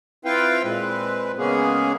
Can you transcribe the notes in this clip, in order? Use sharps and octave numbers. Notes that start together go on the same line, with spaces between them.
C4 E4 F4 B4 F5 G5
A#2 G#3 C4 B4
C#3 G#3 A#3 B3 C#4 G#4